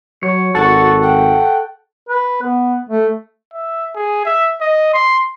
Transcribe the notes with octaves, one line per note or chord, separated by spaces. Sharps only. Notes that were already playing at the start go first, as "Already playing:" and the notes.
F#3 C#5
G#1 F#4 A4 C#6 A6
F#5 G5
B4
B3
A3
E5
G#4
E5
D#5
C6